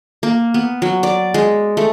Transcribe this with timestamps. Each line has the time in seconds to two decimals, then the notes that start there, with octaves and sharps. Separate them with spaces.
0.23 A#3
0.54 B3
0.82 F#3
1.03 D5
1.34 G#3
1.77 A3